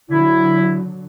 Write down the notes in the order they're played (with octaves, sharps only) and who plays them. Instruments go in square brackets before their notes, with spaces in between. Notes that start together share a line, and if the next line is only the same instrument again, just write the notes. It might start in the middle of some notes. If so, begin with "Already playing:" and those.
[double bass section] D3 F#3 [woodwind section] E4